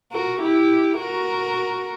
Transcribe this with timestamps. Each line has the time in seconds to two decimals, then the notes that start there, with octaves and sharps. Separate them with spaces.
0.12 F#4 A#4
0.41 E4 G4
0.99 F#4 A#4